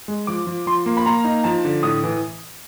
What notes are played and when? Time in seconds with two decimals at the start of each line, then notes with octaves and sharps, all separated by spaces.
0.08 G#3
0.27 F3 D6
0.47 F3
0.67 F3 C6
0.86 A#3
0.97 B5
1.06 A#3 A#5
1.25 D#4
1.44 F3 A5
1.65 D3
1.83 A2 D#6
2.04 E3